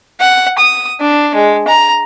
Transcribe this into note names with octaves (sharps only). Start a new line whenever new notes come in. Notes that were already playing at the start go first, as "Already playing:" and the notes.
F#5
D#6
D4
G#3
A#5